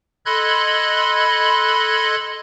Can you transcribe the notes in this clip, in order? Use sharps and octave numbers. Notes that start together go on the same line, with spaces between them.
A4 D#5 B5 C6 F#6 G#6